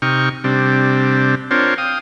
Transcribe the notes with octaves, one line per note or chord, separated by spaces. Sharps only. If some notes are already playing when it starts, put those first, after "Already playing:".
C3 D#4 G5 C#6 F6
C3 G3 C4 D4
C4 D4 F4 A#4 C5 C#5
F5 G5 D#6